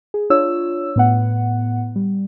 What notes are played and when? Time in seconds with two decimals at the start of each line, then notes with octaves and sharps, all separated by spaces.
0.14 G#4
0.30 D4 F4 C#5 E6
0.96 A2 B3 F#5
1.96 G3